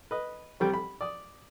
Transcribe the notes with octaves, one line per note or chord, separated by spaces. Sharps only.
B4 D#5
C2 G3 G5
B5
D5 D#6